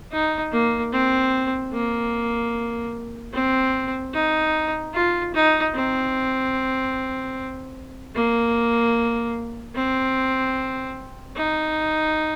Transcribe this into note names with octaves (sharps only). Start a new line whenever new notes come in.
D#4
A#3
C4
A#3
C4
D#4
F4
D#4
C4
A#3
C4
D#4